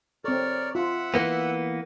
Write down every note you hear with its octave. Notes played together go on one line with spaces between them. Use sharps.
C4 A4 A#4 C#5 D5
F4 E5 F#5
E3 A#3 B3